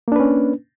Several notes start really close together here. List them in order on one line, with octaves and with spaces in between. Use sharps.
A#3 D4 B4 C#4